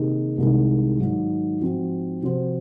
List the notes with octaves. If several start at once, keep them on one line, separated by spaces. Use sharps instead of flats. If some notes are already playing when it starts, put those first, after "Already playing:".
Already playing: C3 D#3 A#3 D#4 G#4
C2 C3 D#3 G#3 D#4
G#2 D#3 F#3
G#2 F3 C4 F#4
C3 F3 C4 F#4 C5